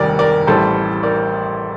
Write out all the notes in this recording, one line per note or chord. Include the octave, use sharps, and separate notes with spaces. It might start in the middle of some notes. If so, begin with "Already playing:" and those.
Already playing: F1 D#2 G3 A#4 D5
A#4 D5
A1 A2 G3 A4 C5
A#4 D5